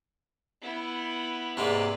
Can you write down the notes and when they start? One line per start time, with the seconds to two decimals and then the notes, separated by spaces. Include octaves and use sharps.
0.61 B3 E4
1.57 G#2 C3 G#3 A#3 B4 D5